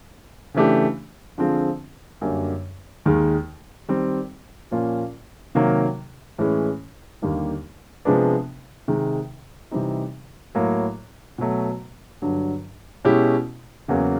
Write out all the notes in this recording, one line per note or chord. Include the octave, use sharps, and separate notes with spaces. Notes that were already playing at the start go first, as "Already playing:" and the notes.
C#3 E3 A3 D4 G4
D3 F3 G#3 C4 F4
F#2 D3 G3 A#3
D#2 D#3 G#3
D#3 G3 C4
A#2 F3 A#3 C#4 F4
C3 D#3 F#3 A#3
A2 E3 G#3 C#4
D#2 D3 G3 A#3 D#4
C3 F3 G#3 B3 D4
C3 D#3 G#3
C3 E3 G3 C4 D#4
A2 F#3 A#3
B2 F#3 A3
G2 D3 F#3
B2 G#3 C#4 E4 G4
E2 C#3 F#3 A#3